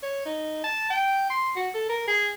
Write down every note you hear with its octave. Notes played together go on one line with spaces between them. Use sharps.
C#5
D#4
A5
G5
C6
F#4
A4
A#4
G#4